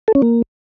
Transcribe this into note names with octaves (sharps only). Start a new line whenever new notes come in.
A4
C#4
A#3